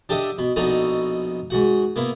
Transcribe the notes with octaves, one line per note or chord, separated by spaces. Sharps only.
D4 G4 A4 D#5 E5 F#5
B2
A#1 B2 D#4 F#4 A4 A#5
G#2 F#4 F#5
A#3 B3 E4